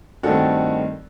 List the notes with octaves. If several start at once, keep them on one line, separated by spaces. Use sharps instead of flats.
G2 D#3 A3 C4 F#4 A4